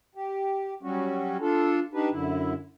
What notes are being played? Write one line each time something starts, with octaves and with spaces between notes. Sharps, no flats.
G4
F#3 G3 C#4 F#4
D4 F4 A4
D4 D#4 G4 B4
F#2 D3 E4